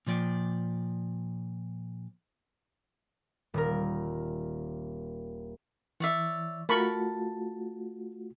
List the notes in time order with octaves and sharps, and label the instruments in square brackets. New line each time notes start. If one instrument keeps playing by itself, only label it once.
[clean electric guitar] A#2 F3 D5 G5
[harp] D#1 A#4
[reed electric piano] E3 [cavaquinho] C#5 D5 E5
[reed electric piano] A3 F4 F#4 [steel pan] A#4 B5 C#6 [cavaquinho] A5